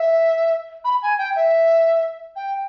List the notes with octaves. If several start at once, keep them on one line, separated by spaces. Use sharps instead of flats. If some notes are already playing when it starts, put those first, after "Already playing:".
Already playing: E5
B5
G#5
G5
E5
G5